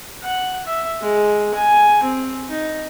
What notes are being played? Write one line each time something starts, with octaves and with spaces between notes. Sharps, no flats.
F#5
E5
G#3
G#5
C4
D#4